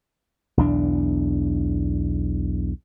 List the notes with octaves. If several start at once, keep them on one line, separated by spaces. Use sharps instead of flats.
B1 E2 D4